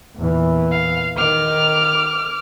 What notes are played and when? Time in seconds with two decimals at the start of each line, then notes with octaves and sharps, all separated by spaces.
0.18 E2 A#2 E3
0.71 F5
1.17 D#3 D6 F6